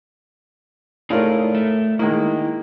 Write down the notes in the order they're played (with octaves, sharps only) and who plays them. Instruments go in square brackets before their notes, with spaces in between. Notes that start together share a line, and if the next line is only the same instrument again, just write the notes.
[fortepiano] A2 F4 A#4 [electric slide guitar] D#4 G#4 D5
[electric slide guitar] A3
[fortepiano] D#3 G#3 A#3 [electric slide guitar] E4